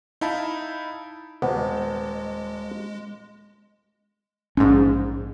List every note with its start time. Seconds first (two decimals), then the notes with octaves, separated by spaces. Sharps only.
0.21 D#4 E4 F5 A5 B5
1.42 D#1 G#3 B3 C5 D#5
4.57 A#1 G#2 C#4